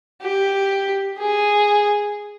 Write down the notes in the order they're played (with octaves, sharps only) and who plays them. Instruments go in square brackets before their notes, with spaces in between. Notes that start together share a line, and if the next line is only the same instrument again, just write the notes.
[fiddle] G4
G#4